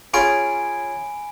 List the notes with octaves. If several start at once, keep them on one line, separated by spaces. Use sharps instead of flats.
C#4 F4 G#4 G#5 B5 D7